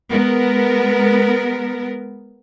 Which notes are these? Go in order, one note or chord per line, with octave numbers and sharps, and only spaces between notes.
G#3 B3 A#4